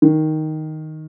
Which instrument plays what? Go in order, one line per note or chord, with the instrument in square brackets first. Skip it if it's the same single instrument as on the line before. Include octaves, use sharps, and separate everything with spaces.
[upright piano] D#3